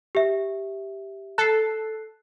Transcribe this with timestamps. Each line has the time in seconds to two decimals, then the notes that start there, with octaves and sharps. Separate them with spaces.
0.15 G4 E5
1.38 A4 F#6 C7